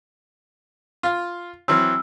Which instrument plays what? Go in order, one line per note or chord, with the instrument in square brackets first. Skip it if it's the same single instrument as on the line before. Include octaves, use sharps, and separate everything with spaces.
[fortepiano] F4 F5
[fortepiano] E3 F#3 C4 [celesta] E6 F6